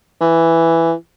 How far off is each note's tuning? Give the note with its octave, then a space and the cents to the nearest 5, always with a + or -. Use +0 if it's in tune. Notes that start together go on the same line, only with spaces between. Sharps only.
E3 +5